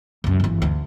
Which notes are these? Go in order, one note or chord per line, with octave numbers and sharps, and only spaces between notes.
C#2 F#2
G1 E3
D2